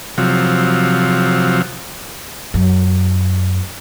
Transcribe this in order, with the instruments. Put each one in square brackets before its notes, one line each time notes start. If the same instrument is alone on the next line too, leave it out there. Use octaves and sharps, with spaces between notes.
[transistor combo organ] C3 F3 F#3
[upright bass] F#2